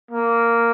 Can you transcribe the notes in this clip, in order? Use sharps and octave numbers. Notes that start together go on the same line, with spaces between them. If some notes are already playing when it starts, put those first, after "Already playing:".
A#3